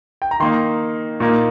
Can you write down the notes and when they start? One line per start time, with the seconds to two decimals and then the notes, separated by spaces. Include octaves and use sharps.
0.22 G5
0.31 A#5
0.40 D#3 A#3 D#4 C6
1.20 A#2 A#3 D#4